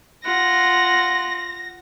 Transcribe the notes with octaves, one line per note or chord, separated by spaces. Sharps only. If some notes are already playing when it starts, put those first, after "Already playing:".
F4 F#5 A#6